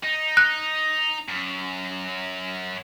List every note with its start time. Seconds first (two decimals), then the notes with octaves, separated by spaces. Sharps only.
0.04 D#4
0.37 F#6
1.28 F#2